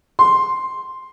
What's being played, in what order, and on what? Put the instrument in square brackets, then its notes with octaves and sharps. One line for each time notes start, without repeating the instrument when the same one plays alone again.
[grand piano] C6